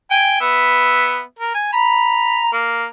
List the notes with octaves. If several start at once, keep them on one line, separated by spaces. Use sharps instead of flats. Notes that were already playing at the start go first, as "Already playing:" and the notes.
G5 G#5
B3 E5
A#4
G#5
A#5 B5
A#3